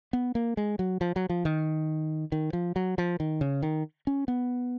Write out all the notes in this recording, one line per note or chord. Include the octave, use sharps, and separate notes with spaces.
B3
A#3
G#3
F#3
F3
F#3
F3
D#3
D#3
F3
F#3
F3
D#3
C#3
D#3
C#4
B3